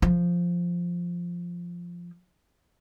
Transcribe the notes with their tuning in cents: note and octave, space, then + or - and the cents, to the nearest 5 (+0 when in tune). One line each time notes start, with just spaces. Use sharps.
F3 +0